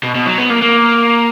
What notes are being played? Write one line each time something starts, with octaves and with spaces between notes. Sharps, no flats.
B2
B2
F#3
B3
A#3
A#3